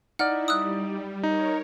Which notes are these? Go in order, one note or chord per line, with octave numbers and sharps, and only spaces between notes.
D#4 E4 D5 F#5 F6
G3 D#6 E6 F#6
D#4 A#4 C#5